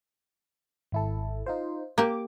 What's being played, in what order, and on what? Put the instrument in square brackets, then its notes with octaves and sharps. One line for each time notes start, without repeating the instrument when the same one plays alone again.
[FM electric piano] G#1 E4 A4
D#4 F4 C5
[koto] A#3 G4 [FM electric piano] D6